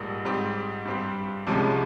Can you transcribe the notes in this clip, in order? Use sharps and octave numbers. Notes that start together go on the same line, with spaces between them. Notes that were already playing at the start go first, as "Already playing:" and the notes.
Already playing: A#1 G#2 G3 A#3
G#2 G3 C4 G4
G2 G3 C4 G4
C2 C3 F3 G#3 C#4